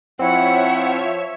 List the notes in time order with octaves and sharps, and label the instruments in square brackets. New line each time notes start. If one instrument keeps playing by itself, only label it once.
[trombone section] F3 [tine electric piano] C4 E4 [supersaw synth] C#5 E5 [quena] F#5